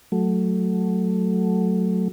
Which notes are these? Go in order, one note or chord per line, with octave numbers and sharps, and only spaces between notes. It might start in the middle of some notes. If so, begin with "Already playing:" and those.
F#3 A3